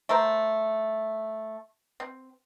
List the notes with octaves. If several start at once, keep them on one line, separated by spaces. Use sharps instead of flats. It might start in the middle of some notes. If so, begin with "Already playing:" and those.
A3 A#4 C5
C4